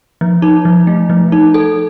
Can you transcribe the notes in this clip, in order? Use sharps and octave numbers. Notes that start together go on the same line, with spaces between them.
F3
D#4
F3
A3
F3
D#4
A4